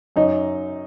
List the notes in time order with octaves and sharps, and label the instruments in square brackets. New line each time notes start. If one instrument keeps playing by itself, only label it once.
[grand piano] F#2 [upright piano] D#4